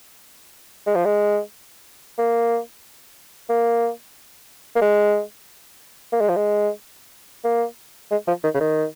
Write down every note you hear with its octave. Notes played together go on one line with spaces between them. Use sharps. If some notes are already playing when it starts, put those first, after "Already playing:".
G#3
F3
G#3
A#3
A#3
A#3
G#3
A#3
G#3
F3
G#3
A#3
G#3
F3
D#3
C#3
D#3